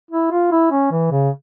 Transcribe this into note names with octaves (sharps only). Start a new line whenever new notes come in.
E4
F4
E4
C#4
E3
C#3